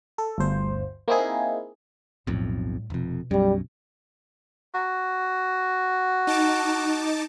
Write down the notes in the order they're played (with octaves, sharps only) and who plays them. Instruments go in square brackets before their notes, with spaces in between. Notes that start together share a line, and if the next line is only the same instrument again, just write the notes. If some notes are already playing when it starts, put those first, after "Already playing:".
[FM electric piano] A4
G1 D2 C5
A#3 C4 D#4 E4 G#4
[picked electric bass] B1 F2 [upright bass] A2 G3
[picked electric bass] F1 F2 [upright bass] B2
[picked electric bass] B1 F#2 [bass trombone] G3
[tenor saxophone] F#4
[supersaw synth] D#4 A5 D6